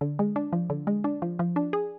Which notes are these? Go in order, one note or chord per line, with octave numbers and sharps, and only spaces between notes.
D3
G#3
D4
F3
D3
G#3
D4
F3
F3
D4
G#4